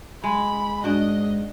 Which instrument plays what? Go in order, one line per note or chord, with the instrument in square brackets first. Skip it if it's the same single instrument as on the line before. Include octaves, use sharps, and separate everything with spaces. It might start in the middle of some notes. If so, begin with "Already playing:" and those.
[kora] G#3 [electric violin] B5
[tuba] G#2 [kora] D4 F#4 [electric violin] D#5